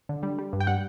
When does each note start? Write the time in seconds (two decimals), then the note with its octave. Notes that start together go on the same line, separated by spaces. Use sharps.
0.09 D3
0.23 G3
0.39 G3
0.53 G2
0.60 G5
0.67 G3 F#5